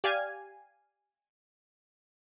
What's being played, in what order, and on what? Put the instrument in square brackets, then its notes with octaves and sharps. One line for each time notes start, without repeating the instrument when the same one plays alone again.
[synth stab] G4 D5 F5 G#5